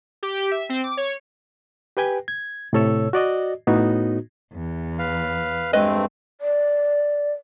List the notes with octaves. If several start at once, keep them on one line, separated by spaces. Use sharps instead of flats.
G4
E5
C4
D6
C#5
G4 B4 G5 G#5
G#6
A2 C3 A4 C#5 E6
F#4 D5 D#5
A2 B3 D#4 F#4
E2
B4 F5
G2 G#3 A3 C4 B4 D#5
D5